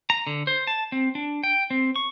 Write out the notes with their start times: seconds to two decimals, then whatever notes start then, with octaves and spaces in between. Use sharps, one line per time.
0.10 A#5
0.27 D3
0.47 C5
0.67 A5
0.92 C4
1.15 D4
1.44 G5
1.70 C4
1.96 C#6